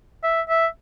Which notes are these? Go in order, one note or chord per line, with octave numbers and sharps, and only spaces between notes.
E5
E5